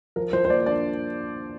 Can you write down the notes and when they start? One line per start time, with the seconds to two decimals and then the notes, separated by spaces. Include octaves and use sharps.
0.16 F3 A#4
0.33 F3 C5
0.45 C5
0.50 A#3 D5
0.66 D4 D5